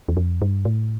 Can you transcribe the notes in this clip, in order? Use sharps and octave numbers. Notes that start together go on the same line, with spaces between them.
E2
F2
G2
A2